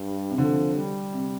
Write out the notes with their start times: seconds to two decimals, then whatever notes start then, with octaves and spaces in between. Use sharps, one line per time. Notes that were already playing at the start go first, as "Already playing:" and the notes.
Already playing: G2
0.30 C3
0.38 D3 F3
0.76 G3
1.13 C3